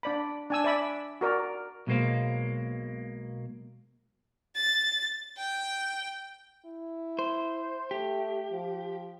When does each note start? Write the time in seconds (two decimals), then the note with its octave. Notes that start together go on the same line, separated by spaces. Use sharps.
0.03 D4 D5 B5
0.50 D4 G#5 E6
0.64 D5 E5 B5 E6
1.21 F#4 A#4 D5
1.87 B1 B2 G#3 A#3 C5 F5
4.56 A6
5.37 G5
6.66 E4
7.19 C5
7.91 A3 G4
8.52 F3